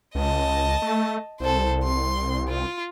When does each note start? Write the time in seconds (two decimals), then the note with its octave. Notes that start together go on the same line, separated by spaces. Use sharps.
0.15 C#2 D#5 A5
0.82 A3
1.40 C2 A4 C5
1.84 C6
2.48 F4